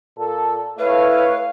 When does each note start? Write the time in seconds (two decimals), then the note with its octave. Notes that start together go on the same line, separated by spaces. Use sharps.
0.18 A#2 A4
0.79 A3 E4 B4 C#5 F5